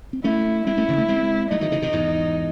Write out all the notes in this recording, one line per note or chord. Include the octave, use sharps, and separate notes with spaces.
C4
A3 C#4 E4
G#3 C4 E4
A3 C#4
C#3 E3
A3 C#4
G#3 C4
F#3 A3 D#4
D#3 F#3
C#3 E3
C3 D#3
E2 G#2